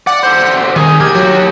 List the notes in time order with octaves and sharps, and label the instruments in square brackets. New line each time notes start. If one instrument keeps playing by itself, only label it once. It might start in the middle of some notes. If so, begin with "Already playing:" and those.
[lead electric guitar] D5 [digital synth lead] F#5
[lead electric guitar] D3 C5
[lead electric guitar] C2 G#4 [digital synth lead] D#3
[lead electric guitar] G4 A#4 [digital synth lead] G#6
[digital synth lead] F#3